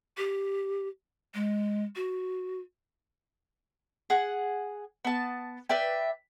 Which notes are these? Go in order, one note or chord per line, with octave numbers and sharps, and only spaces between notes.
G4
G#3
F#4
G#4 F#5
B3 A5
B4 D5 E5 G5